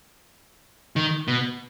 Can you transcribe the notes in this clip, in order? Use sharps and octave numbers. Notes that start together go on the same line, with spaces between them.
D#3
B2